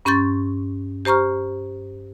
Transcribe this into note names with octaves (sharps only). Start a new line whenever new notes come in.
G2 C#4 C6 C#6 G6 A6
G4 C5 A#5 C#6 F6